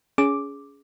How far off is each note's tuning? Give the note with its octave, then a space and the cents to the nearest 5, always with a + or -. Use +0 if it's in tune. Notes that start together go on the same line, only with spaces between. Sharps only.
C#4 +25 G#4 +5 D6 +0